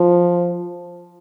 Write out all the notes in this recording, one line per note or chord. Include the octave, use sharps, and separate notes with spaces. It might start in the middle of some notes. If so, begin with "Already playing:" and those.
Already playing: F3